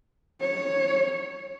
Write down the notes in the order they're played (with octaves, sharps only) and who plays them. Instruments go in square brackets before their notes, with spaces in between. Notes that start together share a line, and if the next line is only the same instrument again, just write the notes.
[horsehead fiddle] C#5